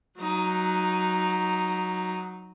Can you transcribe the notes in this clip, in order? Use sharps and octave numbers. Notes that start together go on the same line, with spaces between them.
F#3 D#4